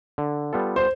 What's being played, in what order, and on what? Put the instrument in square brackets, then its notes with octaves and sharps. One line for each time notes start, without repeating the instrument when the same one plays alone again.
[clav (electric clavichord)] D3
G3 B3 F4 A4
[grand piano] C5